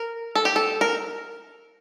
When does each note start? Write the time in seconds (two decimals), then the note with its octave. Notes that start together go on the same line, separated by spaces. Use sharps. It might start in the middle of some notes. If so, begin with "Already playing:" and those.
Already playing: A#4
0.35 A4
0.45 G4
0.56 A4
0.81 A#4